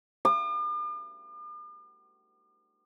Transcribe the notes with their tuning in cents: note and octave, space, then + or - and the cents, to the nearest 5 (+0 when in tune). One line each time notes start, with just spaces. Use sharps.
D6 +45